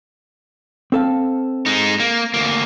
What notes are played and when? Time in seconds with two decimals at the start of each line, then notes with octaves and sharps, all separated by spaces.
0.92 C4 A4 F5
1.66 G#3 D#4
2.00 A#3
2.34 D2 A#3